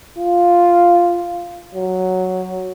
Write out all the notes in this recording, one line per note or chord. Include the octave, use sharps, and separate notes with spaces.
F4
F#3